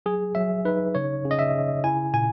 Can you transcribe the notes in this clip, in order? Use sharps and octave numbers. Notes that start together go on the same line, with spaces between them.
F#3 G#4
F#3 E5
D#4 B4
C#3 C#5
C#3
D#5
E5
C#3
E4 G#5
A#2 G#5